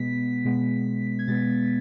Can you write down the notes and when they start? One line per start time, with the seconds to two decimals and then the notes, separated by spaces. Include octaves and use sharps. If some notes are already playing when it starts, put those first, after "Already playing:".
Already playing: B2 G#3 B3 B6
0.45 B2 G#3 B3
1.19 G#6
1.27 B2 G#3 B3 A6